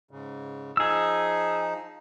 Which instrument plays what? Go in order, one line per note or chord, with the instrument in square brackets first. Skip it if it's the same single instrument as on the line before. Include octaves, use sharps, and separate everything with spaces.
[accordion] G#2 C#3
[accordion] F3 D#4 [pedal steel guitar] G#4 E6